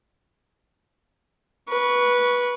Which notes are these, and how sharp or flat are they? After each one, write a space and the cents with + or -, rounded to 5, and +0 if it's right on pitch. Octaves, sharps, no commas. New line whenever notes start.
B4 -15 C#6 +10